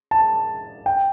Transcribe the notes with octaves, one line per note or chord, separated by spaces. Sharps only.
A5
G5